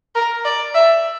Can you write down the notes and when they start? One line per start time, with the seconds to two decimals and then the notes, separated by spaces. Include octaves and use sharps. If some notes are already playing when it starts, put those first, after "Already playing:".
0.15 A#4
0.45 D5
0.74 E5